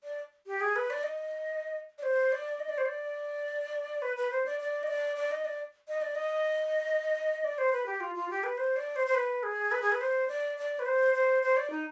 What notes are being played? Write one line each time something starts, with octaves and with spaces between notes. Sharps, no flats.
D5
G4
G#4
B4
D5
D#5
D5
C5
D5
D#5
D5
C5
D5
B4
B4
C5
D5
D5
D#5
D5
D5
D#5
D5
D#5
D5
D#5
D5
C5
B4
G4
F4
F4
G4
B4
C5
D5
C5
C5
B4
G#4
B4
G#4
B4
C5
D5
D5
B4
C5
C5
C5
D5
D#4